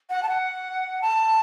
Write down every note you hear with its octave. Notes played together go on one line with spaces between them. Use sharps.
F#5
A5
F#5
A5